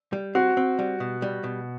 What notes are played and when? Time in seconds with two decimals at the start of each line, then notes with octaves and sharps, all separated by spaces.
0.13 G3
0.35 C4 F#4
0.57 C4
0.79 G3
1.00 B2
1.22 G3
1.44 B2